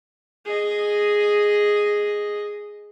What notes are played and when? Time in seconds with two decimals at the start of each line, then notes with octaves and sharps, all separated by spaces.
0.45 G#4 D#5